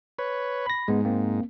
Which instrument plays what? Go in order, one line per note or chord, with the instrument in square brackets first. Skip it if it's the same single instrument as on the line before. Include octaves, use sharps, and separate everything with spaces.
[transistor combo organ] B4 C#5
[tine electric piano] B5 A#6
[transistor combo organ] G#2 [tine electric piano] G#3 B3
[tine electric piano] A#3 C4